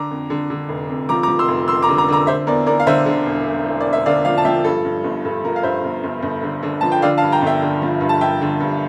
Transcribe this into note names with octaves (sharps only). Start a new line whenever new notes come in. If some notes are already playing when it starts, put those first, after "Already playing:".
Already playing: D3 A#5 D6
F2
D3
D3
F1
F2
F3 A#5 D6
A#5 D6
F3
C6 E6
F1
F2 C6 E6
A#5 D6
D3
A#5 D6
D3 A#5 D6
D3 C5 E5
E2 A#4 D5
E2 A#4 D5
F5
D3 C5 E5
D3
E1
E1
E1
E1 D5
E5
D3 D5 F5
F3 D5 F5
A5
F3 E5 G5
G2 A4
G2
G1
G2 A4
F3 A#4
F5
G2 C5 E5
G1
G1
G1
D3
D3
F3 A5
G5
D3 D5 F5
F5 A5
G2
G5 A#5
G1
E5 G5
D3
F3
G2
A5
G2 E5 G5
D3
G2